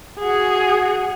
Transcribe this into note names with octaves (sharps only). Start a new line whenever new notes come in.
F#4 G#4